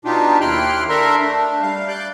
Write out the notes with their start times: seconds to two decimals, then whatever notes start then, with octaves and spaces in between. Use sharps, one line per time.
0.05 B2 D4 D#4 F4 G4
0.41 D#2 E4 G5 C6 F6 F#6
0.89 D4 A4 A#4 E5 A#5 C6
1.23 A3 D4
1.62 G3 F5
1.88 D5 D6 F#6 G6